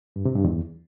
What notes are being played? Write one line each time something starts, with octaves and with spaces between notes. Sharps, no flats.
G2
C3
G2
E2